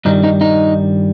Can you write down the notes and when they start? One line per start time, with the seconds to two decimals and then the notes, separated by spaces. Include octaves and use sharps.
0.05 G2 D#3 G3 D#4
0.24 D#4
0.41 D#4